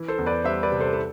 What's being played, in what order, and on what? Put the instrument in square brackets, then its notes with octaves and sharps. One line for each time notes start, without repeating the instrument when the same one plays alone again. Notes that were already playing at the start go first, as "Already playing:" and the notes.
Already playing: [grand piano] E3
A4 C5
E2
B4 D5
G3 C5 E5
B4 D5
C3
A4 C5
A4